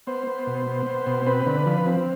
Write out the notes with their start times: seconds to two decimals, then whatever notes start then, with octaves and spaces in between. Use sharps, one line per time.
0.07 B3 C5
0.27 B3
0.47 B2
0.67 B3
0.87 B3
1.07 B2
1.26 C4 B4
1.46 D3
1.66 F3
1.86 C4